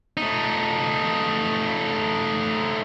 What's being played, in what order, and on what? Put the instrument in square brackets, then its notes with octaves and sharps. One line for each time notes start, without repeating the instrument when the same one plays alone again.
[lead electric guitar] A3 D#4